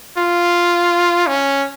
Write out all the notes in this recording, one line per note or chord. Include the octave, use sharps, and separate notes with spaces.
F4
C#4